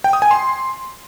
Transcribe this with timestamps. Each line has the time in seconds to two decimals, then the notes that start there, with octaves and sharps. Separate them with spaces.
0.04 G5
0.13 D#6
0.22 G#5
0.31 C6